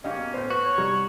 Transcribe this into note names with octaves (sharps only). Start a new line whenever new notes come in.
C#2 G2 A#3 C#4 D#5 F5 G5
B2
A2 B3 C5
F#4 B4
C#5
C3 G3 D#4 A#5 F6